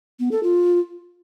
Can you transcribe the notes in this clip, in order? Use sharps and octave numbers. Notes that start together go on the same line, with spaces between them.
B3
A4
F4